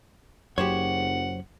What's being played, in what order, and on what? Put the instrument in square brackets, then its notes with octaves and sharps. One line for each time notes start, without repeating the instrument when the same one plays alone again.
[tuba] F#1 [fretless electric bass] F#2 C#3 F#3 [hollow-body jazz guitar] G4 C5 C#5 [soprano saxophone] F#5